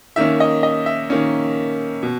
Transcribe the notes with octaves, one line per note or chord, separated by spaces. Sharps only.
D#3 A#3 C#4 E5
D#5
D#5
E5
D#3 A#3 C#4
B2